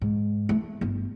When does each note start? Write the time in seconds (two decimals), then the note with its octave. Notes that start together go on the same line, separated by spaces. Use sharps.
0.01 G#2
0.49 A3
0.81 G1